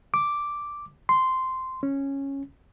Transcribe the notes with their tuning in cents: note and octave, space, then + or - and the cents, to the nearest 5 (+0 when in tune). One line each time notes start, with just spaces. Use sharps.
D6 +0
C6 -10
C#4 -10